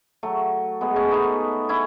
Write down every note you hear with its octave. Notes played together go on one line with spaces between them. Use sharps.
F#3 A3
G#3 B3
A3 C#4
B3 D#4
C#4 E4